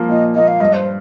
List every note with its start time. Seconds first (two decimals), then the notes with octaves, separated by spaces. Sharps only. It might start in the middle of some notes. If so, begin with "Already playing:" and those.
Already playing: F3 A#3
0.09 A#2 D#5
0.34 F3 A#3 D#5
0.47 F5
0.60 G2 D#5
0.73 C5